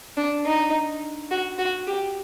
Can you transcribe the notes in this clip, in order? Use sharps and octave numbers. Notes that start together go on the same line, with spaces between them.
D4
D#4
F#4
F#4
G4